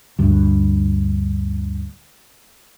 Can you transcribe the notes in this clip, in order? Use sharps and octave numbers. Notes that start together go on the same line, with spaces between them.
D2 G2